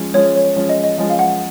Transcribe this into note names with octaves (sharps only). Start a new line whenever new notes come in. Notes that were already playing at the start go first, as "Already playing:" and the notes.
Already playing: F3 G#3 C#4
F3 G#3 C#4 C#5
C#5
F3 G#3 C#4
D#5
D#5
F3 G#3 C#4 D#5
F5
F#5